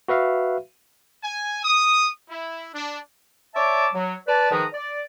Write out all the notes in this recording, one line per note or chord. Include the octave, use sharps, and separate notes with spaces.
F#4 B4 E5 F5
G#5
D#6
E4
D4
C#5 D5 E5 A5 D6
F#3
B4 D5 A5
G#2 D#3 F3 B4 A#5 D#6
D5